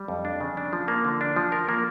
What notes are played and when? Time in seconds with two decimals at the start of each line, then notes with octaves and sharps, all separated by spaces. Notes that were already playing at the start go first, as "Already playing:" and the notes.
Already playing: G3
0.08 F2
0.25 D4
0.41 C#3
0.57 D4
0.73 F3
0.88 A#3
1.05 D3
1.21 D4
1.36 F3
1.52 A#4
1.69 A#3